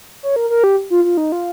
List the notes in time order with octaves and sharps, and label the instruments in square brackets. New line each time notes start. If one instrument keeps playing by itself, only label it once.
[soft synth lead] C#5
A#4
A#4
G4
F4
F4
D#4
F4